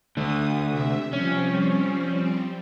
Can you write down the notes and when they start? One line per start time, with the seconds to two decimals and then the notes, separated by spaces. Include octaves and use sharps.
0.17 D3 A3 D#6
0.70 C3 E5
1.13 F3 G3 C4 C#4